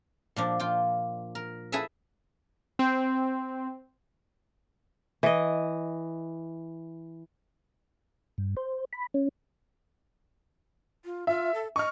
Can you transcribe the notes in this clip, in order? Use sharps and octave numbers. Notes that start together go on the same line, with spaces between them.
A#2 F3 D4
F4 G5
A#4
E4 G#4 A4 B4 E5
C4
E3 D#5
G2
C5
B5
C#4
F4
F4 E5
A4
D#5 C#6 F6